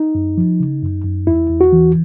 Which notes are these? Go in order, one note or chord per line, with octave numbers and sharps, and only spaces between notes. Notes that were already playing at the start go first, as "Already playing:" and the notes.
Already playing: D#4
F#2
F3
C#3
F#2
F#2
E2 E4
E2
F#4
E3